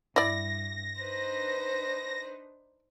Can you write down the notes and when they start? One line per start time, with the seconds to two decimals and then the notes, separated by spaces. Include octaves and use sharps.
0.16 G2 E4 D5 A#6
1.01 D4 D#4 B4 C5